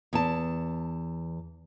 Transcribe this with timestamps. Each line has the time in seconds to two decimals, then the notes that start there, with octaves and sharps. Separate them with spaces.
0.13 E2 A5